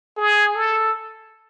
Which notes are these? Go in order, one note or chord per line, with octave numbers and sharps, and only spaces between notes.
G#4
A4